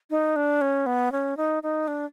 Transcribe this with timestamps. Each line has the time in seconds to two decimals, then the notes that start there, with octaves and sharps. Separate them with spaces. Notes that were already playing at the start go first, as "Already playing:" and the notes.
0.10 D#4
0.36 D4
0.61 C#4
0.86 B3
1.12 C#4
1.37 D#4
1.63 D#4
1.88 D4